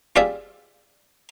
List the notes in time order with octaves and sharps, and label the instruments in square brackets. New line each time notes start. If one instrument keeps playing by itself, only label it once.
[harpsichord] F4 G4 G#4 D5 E5